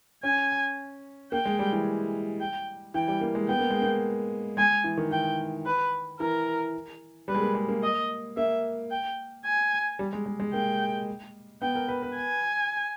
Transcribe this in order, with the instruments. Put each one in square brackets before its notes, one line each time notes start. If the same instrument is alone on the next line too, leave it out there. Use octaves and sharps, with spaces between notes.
[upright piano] C#4 [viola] G#5
[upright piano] A#3 [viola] G5
[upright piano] G#3
G3
E3
[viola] G5
[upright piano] E3 [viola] G5
[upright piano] G3
A#3
G#3
[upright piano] B3 [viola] G5
[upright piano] A#3
G#3
A#3
[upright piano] G#3 [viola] G#5
[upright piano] E3
D#3
[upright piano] E3 [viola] G5
[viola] B4
[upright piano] E3 [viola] A#4
[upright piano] G3 [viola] B4
[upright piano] G#3
A#3
G#3
A#3
[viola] D#5
[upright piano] A#3 [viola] E5
[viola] G5
G#5
[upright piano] G3
G#3
G#3
G#3
[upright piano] A#3 [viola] G5
[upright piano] B3 [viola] G5
[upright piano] A#4
B4
B4
[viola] G#5